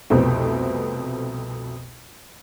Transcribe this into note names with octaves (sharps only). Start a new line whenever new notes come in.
C2 F2 B2 A3 B3 C4